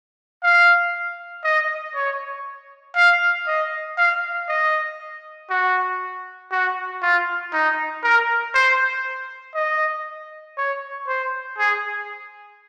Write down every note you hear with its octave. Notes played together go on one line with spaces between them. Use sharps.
F5
D#5
C#5
F5
D#5
F5
D#5
F#4
F#4
F4
D#4
A#4
C5
D#5
C#5
C5
G#4